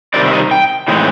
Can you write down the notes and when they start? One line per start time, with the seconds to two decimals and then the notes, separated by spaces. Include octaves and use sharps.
0.14 C3 D#3 G3 C4 D#4 D5
0.28 E5
0.33 D#5
0.51 G5
0.88 A2 E3 G#3 C4 D#4